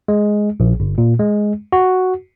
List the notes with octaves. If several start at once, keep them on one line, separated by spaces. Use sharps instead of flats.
G#3
A#1
G1
A#2
G#3
F#4